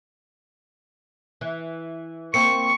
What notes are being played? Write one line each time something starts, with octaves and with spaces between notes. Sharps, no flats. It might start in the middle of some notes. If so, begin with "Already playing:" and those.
E3
A#3 C4 C#6 C#7